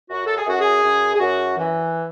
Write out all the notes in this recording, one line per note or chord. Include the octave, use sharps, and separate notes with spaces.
F#2 F#4
A4
G#4
F#2 F#4
G#4
F#2
G#4
F#2 F#4
E3